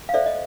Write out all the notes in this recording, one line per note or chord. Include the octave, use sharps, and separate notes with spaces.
F5
A4 C5 D5 E5
D#5